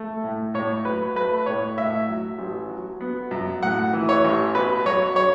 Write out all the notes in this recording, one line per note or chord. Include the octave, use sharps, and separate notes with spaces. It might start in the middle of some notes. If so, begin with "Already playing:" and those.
Already playing: A3
A2
A2 C#5
F#3 B4
A3 B4
A2 C#5
A2 E5
F#3
A1
F#3
B3
F#2
A2 F#5
E3
C#5
A1
B2 B4
F#3 C#5
C#5